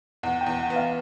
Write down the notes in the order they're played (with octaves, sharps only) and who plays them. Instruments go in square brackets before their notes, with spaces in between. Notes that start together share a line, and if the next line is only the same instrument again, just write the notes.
[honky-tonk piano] E2 [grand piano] F#5
[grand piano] G5
[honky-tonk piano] E2
[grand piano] F#5
[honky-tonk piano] B3
[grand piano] F5